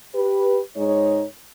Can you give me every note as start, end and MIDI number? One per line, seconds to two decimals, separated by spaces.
0.14 0.59 67
0.14 0.59 71
0.76 1.24 44
0.76 1.24 56
0.76 1.24 63
0.76 1.24 73